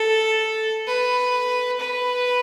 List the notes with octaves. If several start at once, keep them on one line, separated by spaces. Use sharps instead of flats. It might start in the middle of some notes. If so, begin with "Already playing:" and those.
Already playing: A4
B4
B4